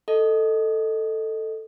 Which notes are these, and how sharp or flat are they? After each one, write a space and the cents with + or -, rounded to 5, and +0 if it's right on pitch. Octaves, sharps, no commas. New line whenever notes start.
A4 +5 D#5 +0